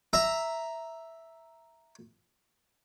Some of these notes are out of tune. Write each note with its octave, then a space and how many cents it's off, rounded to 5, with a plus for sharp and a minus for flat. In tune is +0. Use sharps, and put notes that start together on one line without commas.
E5 +0 A#5 +0